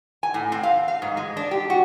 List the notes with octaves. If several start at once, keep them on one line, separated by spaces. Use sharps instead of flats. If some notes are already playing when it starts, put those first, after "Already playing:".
G#5
A2
C4
F5
F5
G#2
G#3
D4
G4
F#4